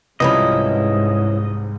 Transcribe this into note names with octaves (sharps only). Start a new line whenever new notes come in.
C2 G#2 F3 C#4 E4 B4 D#5 B5